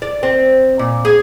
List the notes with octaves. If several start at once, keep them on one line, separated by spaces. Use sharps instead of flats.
D5
C4
A#2
G#4